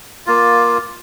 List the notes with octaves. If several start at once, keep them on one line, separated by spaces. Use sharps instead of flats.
A#3 F4